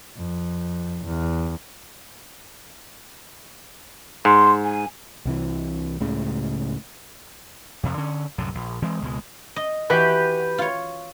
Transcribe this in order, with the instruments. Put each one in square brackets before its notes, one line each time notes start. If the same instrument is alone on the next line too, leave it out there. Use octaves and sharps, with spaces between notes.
[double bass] F2
E2
[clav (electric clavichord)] G#2 [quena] C6
[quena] G#5
[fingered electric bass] C2 C3 E3
C#2 A2 C#3
[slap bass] F2 C3 F3
D3 C#4
C2 F#2 A2 D3
A#1
E3 G#3 C4
C#2 B2 F3 G#3
[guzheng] D#5
[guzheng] E3 F#4 [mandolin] G4 B4
[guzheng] F4 C#5